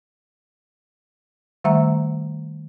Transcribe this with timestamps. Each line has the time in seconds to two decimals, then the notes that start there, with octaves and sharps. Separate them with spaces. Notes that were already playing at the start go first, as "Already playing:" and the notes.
1.64 D#3 G3 A3 E5 F#5 A#5